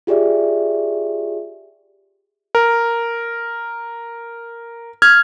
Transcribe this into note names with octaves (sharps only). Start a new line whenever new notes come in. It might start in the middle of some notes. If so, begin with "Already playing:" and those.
F4 G4 G#4 D5 E5
A#4
F6 G#6